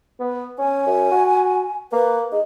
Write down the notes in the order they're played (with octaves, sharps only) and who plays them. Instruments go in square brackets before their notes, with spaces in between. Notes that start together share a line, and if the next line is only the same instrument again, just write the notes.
[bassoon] B3
[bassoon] C#4 [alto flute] G#5
[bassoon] F#2
F#4
[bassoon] A#3 [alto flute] B4
[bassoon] D#4 [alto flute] G#4